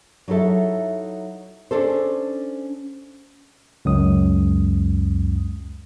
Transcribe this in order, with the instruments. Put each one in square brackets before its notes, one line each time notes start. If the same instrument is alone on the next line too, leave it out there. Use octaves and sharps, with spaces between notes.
[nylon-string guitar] F#3 D#4 E4 A4 E5
C#4 D4 A4 C5
[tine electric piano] C#2 F#2 D#6